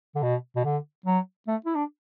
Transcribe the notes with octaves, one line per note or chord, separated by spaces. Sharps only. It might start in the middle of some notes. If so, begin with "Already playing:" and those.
D3
B2
B2
D3
F#3
A3
E4
D4